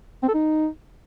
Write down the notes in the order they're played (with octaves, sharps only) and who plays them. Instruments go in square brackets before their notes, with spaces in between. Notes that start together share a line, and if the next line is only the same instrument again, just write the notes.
[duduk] C4
A4
D#4